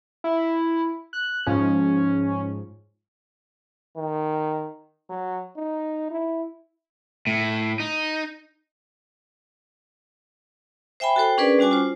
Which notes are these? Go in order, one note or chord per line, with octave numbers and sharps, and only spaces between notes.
E4
F#6
G#2 F3 C#4
D#3
F#3
D#4
E4
A2
D#4
C5 E5 G5 G#5 B5
F#4 A4 C5 G5
C#4 D4 G#4 A#4 B4 D5
G3 C#4 F#4 G#5 D6
F4 C5